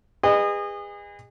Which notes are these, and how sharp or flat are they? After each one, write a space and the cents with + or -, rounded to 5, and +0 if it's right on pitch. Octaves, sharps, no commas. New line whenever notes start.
G#4 -35 B4 +5 D#5 -25